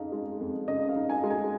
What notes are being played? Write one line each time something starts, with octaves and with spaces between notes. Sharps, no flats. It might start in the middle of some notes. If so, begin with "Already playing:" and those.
Already playing: F2 C#3 G#3 D#4 F5
G#3
F2
C#3 D#5
F5
D#4
G#5
G#3
G#5